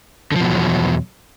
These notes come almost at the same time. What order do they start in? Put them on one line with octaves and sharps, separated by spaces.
D3 F3 B2 F#3 E2